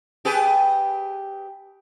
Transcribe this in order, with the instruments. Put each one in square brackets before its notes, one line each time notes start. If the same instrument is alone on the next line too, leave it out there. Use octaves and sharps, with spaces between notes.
[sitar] G4 G#4 B4